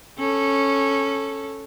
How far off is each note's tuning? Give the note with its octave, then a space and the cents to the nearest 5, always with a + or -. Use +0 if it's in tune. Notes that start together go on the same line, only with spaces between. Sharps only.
C#4 -10 A4 +0